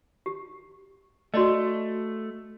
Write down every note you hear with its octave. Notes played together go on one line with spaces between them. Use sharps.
G4
A3 F#4 D5 D#5